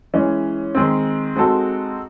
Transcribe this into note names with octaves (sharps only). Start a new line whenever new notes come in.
E3 G#3 C#4
D#3 G#3 C4
G#3 C4 D#4 F#4 A4